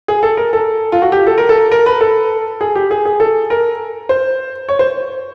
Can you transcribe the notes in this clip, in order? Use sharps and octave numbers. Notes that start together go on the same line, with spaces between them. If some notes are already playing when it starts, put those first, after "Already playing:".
G#4
A4
A#4
A4
F4
F#4
G4
A4
A#4
A4
A#4
B4
A4
G#4
G4
G#4
G#4
A4
A#4
C5
C#5
C5